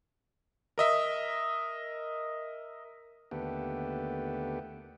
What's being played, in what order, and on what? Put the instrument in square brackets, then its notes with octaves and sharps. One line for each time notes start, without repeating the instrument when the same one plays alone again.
[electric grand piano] A#4 D#5 E5
[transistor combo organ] D#2 D3 A3 B3 G4